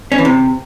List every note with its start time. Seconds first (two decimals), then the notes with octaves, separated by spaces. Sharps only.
0.12 C#4
0.18 E3
0.25 C3